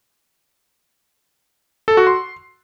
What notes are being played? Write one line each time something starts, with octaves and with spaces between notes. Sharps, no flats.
A4
F#4
C6